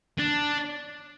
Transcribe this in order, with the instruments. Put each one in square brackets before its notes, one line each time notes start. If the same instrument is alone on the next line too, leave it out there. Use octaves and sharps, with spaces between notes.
[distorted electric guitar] D4